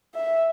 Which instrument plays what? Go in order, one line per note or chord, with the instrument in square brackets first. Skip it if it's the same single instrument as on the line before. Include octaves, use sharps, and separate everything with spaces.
[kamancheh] E5